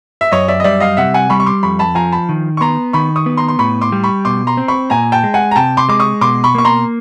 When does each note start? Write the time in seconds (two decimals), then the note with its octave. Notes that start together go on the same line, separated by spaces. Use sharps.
0.21 E5
0.32 F#2 C#5 D#5
0.48 D5 E5
0.60 D#5
0.64 G3 D5 E5
0.80 D#5 F5
0.97 C3 E5 F#5
1.14 F#5 G#5
1.30 G3 B5 C#6
1.40 C#6
1.46 C6 D6
1.63 F2 B5 C#6
1.79 A5 B5
1.95 F3 G#5 A#5
2.12 A5 B5
2.29 D#3
2.57 C#6
2.61 B3 A#5 C6
2.93 D#3 B5 C#6
3.16 C#6 D#6
3.26 B3
3.37 A#5 C6
3.48 C6
3.59 A2 B5 C#6
3.81 C6 D6
3.92 G3
4.04 B5 C#6
4.25 B2 C6 D6
4.47 A#5 C6
4.57 C4
4.68 B5 C#6
4.90 A#2 G#5 A#5
5.12 G5 A5
5.23 G#3
5.34 F#5 G#5
5.51 A#5
5.56 C3 G5 A5
5.77 C6 D6
5.89 G#3 D6
6.00 C#6 D#6
6.21 B2 C6 D6
6.44 B5 C#6
6.55 A#3 C#6
6.65 A#5 C6